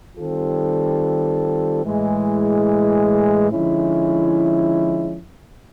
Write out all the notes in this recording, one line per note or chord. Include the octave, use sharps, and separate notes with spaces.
D#3 G3 C4 F4 A4
A2 E3 G#3
D3 F3 G#3 C#4 E4